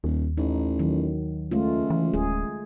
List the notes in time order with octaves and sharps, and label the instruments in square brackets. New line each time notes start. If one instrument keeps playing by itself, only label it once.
[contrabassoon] D#1 [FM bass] D#2
[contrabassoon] A1 [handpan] D#4
[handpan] D#3 F#3
[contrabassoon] C#2 [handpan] G#3 A3 F4
[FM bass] E3
[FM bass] D1 [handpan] G#4